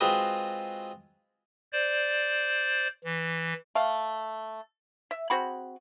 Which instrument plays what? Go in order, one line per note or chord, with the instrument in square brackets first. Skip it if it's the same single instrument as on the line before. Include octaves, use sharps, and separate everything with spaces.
[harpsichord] G#3 C4 F4 F#4 G#4 B4
[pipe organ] C5 D5
E3
[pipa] A3 F5
E5
C4 F#4 G#4 B5